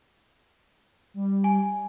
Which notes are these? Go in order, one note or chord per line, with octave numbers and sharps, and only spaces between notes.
G3
G#5